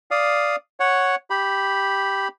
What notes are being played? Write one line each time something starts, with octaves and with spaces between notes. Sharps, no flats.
D5 F5 D#6
C#5 F#5
G4 B5